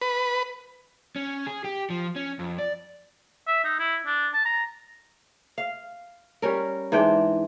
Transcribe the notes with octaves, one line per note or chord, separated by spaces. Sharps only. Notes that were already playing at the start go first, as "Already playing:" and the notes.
B4
C#4
G#4
G4
F3
C#4
F2
D5
E5
D#4
E4
D4
A5
A#5
F5
G3 C#4 A#4
G#2 E3 D4 G5